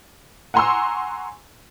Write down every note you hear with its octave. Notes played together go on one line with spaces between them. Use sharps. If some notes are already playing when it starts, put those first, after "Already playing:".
F#5 G#5 A#5 C6 C#6 E6